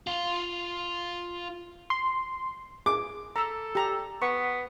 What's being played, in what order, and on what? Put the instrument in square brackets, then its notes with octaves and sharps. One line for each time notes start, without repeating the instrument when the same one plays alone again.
[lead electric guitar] F4 F5
[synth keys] C6
[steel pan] G#4 [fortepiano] D6
[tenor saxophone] A4 [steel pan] A#5 E6
[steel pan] G4 A#5
[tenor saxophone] B3 [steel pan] C#6